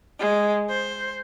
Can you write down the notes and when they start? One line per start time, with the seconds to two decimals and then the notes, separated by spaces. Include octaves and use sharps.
0.19 G#3
0.70 C5